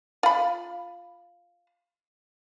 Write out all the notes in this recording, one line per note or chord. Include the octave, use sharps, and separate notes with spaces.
F4 B5